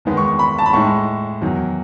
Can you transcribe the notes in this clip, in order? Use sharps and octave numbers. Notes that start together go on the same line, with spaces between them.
E2 D#3 G#3 B3
C#6
C#6
B5
A5
B5
A2 G#3 D#4 C#6
E2 D#3 F#3